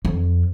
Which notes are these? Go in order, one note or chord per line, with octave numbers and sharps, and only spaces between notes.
F2